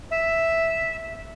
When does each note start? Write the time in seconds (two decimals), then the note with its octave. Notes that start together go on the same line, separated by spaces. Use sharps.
0.11 E5